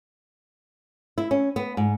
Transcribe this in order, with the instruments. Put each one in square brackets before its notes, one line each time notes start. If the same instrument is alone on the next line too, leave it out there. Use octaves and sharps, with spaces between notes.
[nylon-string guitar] E4
C#4
B3
G#2